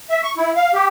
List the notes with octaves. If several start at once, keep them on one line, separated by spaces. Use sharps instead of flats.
E5
C#6
E4
F5
G4